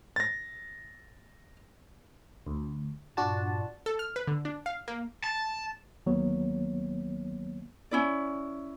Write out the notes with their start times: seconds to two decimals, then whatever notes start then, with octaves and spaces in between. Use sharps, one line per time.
0.16 A6 A#6
2.47 D2
3.17 G2 A#2 D4 F4 F#4 A5
3.86 A4
3.99 F6
4.16 B4
4.27 D3
4.45 D4
4.66 F5
4.88 A#3
5.24 A5
6.06 D2 D#3 F#3 A#3 B3 C#5
7.91 C#4 E4 D5